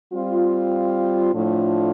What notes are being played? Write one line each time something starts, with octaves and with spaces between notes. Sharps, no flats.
G3 C4 F4
A2 F3 A3 D4 F4